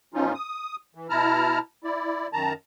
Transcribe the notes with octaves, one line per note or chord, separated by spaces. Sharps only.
F#2 B2 F3 C#4 D#4 F4
D#6
E3
B2 E4 A5 A#5 F6
E4 D5
F#2 D#3 A5 A#5